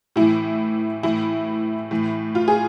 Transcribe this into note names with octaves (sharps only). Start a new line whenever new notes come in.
A2 E3 E4
A2 E3 E4
A2 E3
F4
G#4